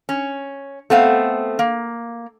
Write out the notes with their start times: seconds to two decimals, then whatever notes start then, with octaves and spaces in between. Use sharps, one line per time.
0.09 C#4
0.90 A3 B3 C4 F5
1.59 A#3